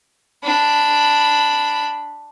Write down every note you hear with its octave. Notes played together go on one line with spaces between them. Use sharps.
D4 B5